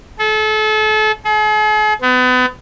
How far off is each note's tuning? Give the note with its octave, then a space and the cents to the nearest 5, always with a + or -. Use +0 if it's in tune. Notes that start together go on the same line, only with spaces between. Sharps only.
A4 -35
G#4 +45
B3 +35